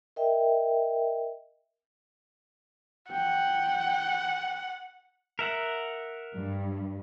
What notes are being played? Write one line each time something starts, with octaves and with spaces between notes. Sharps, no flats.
A#4 D#5 E5 G5
F#5 G5
A#4 E5 F#5
G2